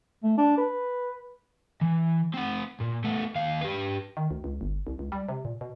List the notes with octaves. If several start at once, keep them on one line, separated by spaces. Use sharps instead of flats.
A3
D4
B4
E3
C4 F#5
A#2
A3 B3
D#2 F5
G4 B4
D#3
D2
C#2
G1
C2
C#2
G3
C3
A#2
B2